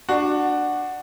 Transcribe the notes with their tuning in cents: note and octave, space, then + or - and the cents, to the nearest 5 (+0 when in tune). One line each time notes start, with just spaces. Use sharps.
D4 +15 F#4 +0